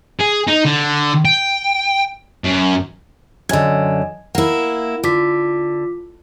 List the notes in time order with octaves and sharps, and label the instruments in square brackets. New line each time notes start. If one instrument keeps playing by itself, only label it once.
[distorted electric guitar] G#4
D#4
D3
G5
F#2
[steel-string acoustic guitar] F#2 D3 [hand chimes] D#5 G#5 G#6
[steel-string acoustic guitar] A#3 E4 [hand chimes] A#4 F#5
[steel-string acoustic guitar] D3 [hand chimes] F4 D6 B6